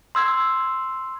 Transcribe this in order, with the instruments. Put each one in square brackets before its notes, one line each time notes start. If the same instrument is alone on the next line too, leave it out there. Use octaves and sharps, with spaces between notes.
[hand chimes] C6 E6 G#6